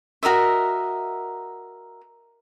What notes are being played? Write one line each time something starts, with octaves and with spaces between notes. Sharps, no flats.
F#4 A#4 D#5 E5